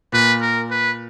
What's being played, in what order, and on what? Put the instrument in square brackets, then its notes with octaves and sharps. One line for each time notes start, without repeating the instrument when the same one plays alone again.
[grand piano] A#2 [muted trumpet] B4
[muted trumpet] A#4
B4